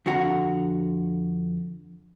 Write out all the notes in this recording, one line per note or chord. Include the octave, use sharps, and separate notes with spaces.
F2 D3 F#4 F#5 A#5